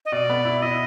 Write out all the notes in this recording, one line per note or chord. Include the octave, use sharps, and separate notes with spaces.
D#5
B2 D5
B3
E4
E4 D#5